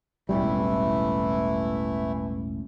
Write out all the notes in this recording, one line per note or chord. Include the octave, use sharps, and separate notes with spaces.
E1 A1 E3 G3 A3 E4